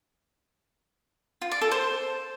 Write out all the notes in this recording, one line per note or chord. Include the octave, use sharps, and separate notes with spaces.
F4
D5
A4
C5